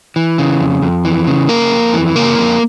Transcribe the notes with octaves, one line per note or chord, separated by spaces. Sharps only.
E3
C#3
F2
F2
E3
C#3
F2 A#3 A#4
F2
E3
C#3 A#3 A#4
F2